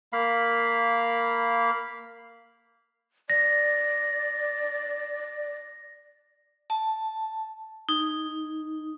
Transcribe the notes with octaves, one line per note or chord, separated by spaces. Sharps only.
A#3 F5 B5
D5 A#6
A5
D#4